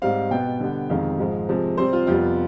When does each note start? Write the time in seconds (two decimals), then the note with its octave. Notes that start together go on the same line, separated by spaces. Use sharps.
0.02 G#2 G3 C4 F5
0.31 B2 B3 G5
0.60 D3 G3 B3
0.90 F2 C3 D#3 G#3 F5
1.19 G#2 F3 G#3
1.49 C3 F3 G#3
1.77 C3 G3 C4 C5
1.93 F4
2.07 F2 C3 G3 B3 F4